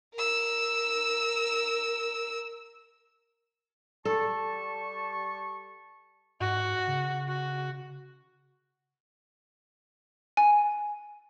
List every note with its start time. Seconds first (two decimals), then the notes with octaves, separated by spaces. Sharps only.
0.14 A#4 E6
4.05 G3 A4 A5 C#6
6.40 G#2 F#4
6.87 C#3
7.28 F#4
10.37 G#5